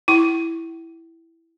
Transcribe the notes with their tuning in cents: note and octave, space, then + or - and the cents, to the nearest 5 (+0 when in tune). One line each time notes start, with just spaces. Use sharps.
E4 +0 G5 -40 C#6 -15